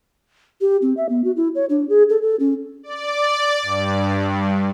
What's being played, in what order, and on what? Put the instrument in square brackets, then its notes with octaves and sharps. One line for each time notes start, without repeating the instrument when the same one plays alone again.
[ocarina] G4
C4
E5
B3
F#4
E4
C#5
D4
G#4
A4
A4
C#4
[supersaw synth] D5
G2